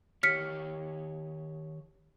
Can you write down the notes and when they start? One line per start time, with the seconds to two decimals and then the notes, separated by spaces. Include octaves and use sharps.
0.23 D#3 G4 C#5 F6 B6 C#7